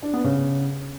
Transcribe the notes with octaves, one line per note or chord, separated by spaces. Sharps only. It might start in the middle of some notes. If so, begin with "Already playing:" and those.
D4
B3
C#3